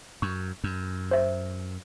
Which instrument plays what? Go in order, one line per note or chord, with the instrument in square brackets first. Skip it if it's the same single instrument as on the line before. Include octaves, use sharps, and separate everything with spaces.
[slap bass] F#2 [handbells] C#6
[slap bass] F#2
[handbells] C5 E5